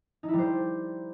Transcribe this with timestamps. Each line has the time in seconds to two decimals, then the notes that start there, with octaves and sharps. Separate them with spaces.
0.23 D#4
0.28 E4
0.34 G3
0.39 C5